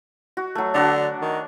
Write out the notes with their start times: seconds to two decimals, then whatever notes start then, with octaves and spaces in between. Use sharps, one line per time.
0.37 F#4
0.55 F#3 A3
0.74 D3 D4 F#4 D5
1.22 D#3